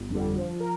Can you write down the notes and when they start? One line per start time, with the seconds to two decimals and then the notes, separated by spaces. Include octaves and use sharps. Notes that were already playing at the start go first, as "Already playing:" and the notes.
Already playing: G1
0.10 F2 D3 G3
0.35 F3
0.60 A#4